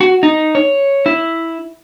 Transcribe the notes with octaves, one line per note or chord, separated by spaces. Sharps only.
F#4
D#4
C#5
E4